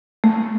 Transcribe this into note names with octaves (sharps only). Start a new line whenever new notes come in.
A3